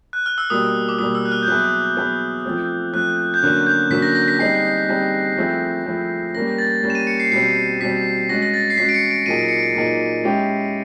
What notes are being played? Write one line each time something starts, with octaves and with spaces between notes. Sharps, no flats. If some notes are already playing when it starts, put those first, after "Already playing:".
F#6
F6
E6
B2 G3 A#3 D#6
D6
B2 G3 A#3 D#6
E6
F#6
F6
G6
F#3 B3 E4 G#4 F#6
F#3 B3 E4 G#4
F3 A3 C4
F3 A3 C4 F#6
G6
D3 F#3 A#3 C#4 F#4 F#6
G6
D3 F#3 A#3 C#4 F#4 B6
A#6
A#6
B6
G3 C4 D#4 G#4 C7
G3 C4 D#4 G#4
F3 A3 C4 E4 G#4
F3 A3 C4 E4 G#4
G3 A#3 C#4 A#6
A6
G3 A#3 C#4
E7
D#7
C#7
C7
B2 G3 C4 C7
B2 G3 C4 B6
G#3 C#4 F#4 A#6
A#6
A6
C7
G#3 C#4 F#4 B6
D7
C#7
D7
A#2 F#3 A#3 D#4 G#4 D#7
D7
C#7
D7
A#2 F#3 A#3 D#4 G#4
G#3 C#4 E4 G4